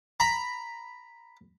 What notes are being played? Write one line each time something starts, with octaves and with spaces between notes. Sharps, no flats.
A#5 B5